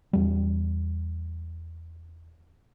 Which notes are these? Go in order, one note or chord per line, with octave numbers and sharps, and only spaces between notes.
E2 G3